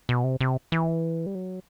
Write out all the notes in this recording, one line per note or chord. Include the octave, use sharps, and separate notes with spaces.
B2
C3
C3
E3
G3
F#3